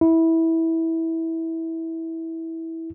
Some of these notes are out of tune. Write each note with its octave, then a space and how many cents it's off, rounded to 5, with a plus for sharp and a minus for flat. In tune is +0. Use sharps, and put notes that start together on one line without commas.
E4 -15